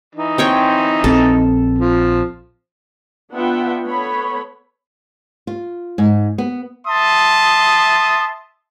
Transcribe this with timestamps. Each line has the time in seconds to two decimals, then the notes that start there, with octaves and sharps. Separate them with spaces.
0.15 E3 D#4
0.38 C4 C#5 G5
1.04 A#1 C4 A4
1.79 F3
3.31 B3 D4 F4 E5 F#5 G5
3.85 B3 A4 C#5 B5
5.47 F4
5.98 G#2
6.38 B3
6.87 E5 A5 C6 D#6